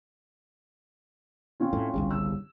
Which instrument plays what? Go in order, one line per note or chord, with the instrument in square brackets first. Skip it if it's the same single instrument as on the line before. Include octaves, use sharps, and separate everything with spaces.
[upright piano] C4 C#4 F4
[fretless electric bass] A2
G1 C2 C#3
[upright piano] E6